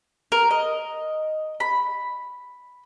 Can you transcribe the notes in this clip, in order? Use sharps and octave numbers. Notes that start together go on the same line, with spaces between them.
A#4
D#5
B5